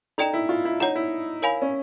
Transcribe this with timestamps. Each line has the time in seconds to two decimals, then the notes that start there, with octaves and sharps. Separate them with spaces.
0.18 D#4 A4 D5 G5 A#5
0.34 E4
0.49 F4
0.65 E4
0.80 D#4 C#5 F#5 A#5
0.95 E4
1.42 A#4 C#5 F5 G#5 B5
1.62 C#4